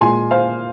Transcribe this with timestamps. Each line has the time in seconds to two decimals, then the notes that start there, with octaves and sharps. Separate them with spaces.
0.01 A#2 G#3 G#5 C6
0.31 C5 F5